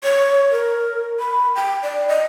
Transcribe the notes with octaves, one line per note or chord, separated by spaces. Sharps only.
C#5
A#4
B5
G5
D5
D#5